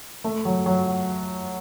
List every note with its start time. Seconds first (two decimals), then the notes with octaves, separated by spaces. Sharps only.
0.24 A3
0.45 F#3
0.66 F#3